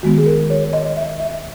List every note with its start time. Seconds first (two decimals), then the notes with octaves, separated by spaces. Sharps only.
0.03 D#3 G#3 B3 F#4
0.18 G#4
0.26 A#4
0.50 C#5
0.73 D#5
0.97 E5
1.20 E5